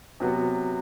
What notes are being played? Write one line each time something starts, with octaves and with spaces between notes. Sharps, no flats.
C3 F#3 B3